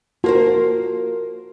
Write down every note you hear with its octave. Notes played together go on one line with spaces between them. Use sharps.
A#3 F4 F#4 A#4 C5 A5